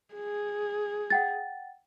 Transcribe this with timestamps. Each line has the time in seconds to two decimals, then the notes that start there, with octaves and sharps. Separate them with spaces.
0.14 G#4
1.10 F#5 G5 A6